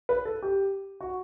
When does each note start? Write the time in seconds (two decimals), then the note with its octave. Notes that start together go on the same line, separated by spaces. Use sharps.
0.09 B4
0.25 A4
0.42 G4
1.01 F#4